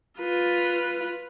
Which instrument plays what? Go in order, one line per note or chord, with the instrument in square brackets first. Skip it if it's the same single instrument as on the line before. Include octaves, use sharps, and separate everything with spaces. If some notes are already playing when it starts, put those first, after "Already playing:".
[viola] F4 B4